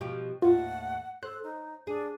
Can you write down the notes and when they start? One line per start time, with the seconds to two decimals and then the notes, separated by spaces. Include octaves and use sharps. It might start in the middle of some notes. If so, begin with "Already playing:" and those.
0.01 B2 F3 G4
0.42 D#2 A2 F4 F#5
1.23 A4 C5 F#6
1.44 D#4
1.87 D4 G#4